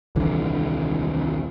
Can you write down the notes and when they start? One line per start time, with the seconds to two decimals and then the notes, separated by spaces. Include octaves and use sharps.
0.16 D#1 C2 D3 E3